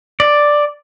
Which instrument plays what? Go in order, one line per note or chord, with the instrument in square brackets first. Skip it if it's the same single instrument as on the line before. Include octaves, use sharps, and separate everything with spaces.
[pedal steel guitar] D5